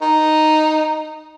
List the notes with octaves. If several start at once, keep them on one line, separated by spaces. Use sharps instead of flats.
D#4